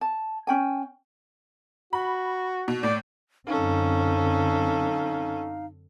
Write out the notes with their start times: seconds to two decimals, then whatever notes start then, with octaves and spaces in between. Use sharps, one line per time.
0.01 A5
0.47 C#4 G5 G#5
1.93 F#4 B5
2.68 B2
2.83 A2 D5
3.47 F#2 D3 C4 C#4 D#4 A4 F5